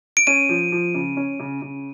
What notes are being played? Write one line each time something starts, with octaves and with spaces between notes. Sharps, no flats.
D7
C#4 D#7
F3
F3
C#3
C#4
C#3
C#3